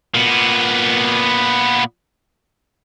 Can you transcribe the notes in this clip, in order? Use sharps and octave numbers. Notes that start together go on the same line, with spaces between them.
A#2 B3